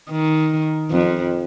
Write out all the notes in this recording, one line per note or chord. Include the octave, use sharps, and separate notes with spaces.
D#3
F2